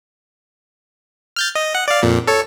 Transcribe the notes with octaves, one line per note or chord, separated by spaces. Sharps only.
F6 G6 A6
D#5
F#5
D5 F5
F2 A#2
A4 C#5